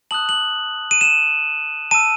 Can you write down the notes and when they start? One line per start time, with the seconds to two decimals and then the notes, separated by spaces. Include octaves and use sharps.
0.11 A5 D#6 F#6 F#7
0.29 F#7
0.91 D#7
1.01 E7
1.91 A5 E6 D#7